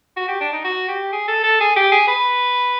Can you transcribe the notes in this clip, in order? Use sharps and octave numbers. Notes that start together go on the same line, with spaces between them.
F#4
G4
D4
D#4
F#4
G4
G#4
A4
A4
G#4
G4
G#4
B4